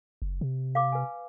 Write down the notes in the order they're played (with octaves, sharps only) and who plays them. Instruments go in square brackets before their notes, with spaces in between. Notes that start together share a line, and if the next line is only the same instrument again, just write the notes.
[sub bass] F#1
C3
[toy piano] F5 D6
B4 G#5